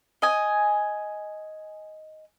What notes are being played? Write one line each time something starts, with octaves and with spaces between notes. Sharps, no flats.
D#5 G#5